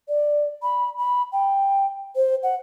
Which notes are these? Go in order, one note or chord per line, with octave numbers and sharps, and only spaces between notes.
D5
B5
B5
G5
C5
F#5